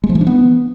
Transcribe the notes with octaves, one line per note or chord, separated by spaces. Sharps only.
G#3
F3
E3
D4
B3